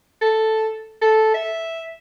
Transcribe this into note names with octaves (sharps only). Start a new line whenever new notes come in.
A4
A4
E5